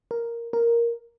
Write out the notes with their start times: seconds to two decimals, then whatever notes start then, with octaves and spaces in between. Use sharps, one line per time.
0.11 A#4
0.53 A#4